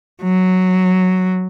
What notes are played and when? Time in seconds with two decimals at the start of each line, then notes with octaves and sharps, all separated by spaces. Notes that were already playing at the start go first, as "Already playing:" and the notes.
0.23 F#3